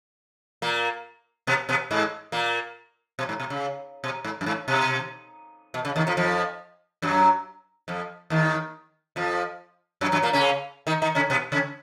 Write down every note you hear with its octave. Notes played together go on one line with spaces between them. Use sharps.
A#2 A#3
B2 B3
B2 B3
G#2 G#3
A#2 A#3
B2
G#2
B2
C#3
B2
G#2
F#2
G#2
B2
B2
C#3
D#2 D#3
F2 F3
F2 F3
F#2 F#3
F2 F3
D#2 D#3
F2 F3
F#2 F#3
F#2 F#3
A#2 A#3
C#3 C#4
D#3 D#4
D#3 D#4
C#3 C#4
B2 B3
C#3 C#4